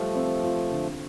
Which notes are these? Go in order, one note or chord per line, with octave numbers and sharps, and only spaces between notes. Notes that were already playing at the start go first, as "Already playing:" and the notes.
Already playing: F3 G3 A3
C4
F4
D3